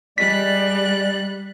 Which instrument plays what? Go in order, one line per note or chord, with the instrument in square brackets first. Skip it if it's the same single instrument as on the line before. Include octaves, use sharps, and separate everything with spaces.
[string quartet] G3 F#6 [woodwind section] G#3 D5 [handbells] B6